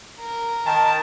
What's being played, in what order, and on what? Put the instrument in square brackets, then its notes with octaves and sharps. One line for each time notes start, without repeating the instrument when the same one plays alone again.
[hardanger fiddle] A#4
[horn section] D#3 A5